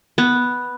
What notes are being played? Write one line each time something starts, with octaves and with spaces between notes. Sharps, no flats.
B3